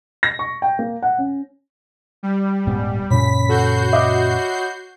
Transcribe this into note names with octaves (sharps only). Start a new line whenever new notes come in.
A#6
C#6
G5
A#3
F#5
C#4
G3
D#1 G#2 B3
F#2 A#2 C#3 C#5 B5 B6
F#4 A4 G6 C7
D#5 E5 D6